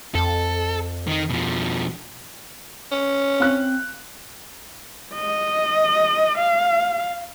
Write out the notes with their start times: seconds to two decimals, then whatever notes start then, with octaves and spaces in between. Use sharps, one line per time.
0.15 F2 A4
1.07 D#3 D#4
1.30 B2 F3
2.92 C#4
3.40 C4 F5 F#6
5.14 D#5
6.37 F5